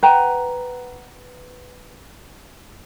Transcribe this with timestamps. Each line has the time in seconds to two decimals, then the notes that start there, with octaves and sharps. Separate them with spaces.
0.03 B4 F#5 G5 A#5